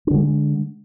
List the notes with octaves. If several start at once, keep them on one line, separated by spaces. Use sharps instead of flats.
D3 G#3 D4